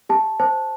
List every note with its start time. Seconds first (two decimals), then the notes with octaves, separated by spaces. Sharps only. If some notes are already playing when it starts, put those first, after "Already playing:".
0.09 G4 A5
0.40 C5 A5